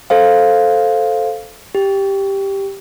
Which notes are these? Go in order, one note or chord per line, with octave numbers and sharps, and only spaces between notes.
A4 C5 F5
G4